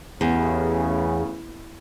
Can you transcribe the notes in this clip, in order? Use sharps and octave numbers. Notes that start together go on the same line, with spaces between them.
A1 E2 C#3 B3